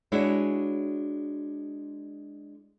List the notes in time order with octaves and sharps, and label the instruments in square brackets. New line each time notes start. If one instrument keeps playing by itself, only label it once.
[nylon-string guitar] G#3 D4 E4 F#4 C#5